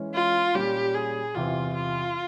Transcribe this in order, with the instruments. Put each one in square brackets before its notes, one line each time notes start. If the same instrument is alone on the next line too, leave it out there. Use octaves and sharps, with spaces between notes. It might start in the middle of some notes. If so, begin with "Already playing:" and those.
Already playing: [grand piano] E3 G#3 C#4
[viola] F4
[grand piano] A#2 G3 C#4 [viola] G4
[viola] G#4
[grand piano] E2 C3 E3 [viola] F4
[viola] F4